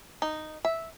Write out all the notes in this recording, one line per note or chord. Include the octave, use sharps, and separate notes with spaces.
D#4
E5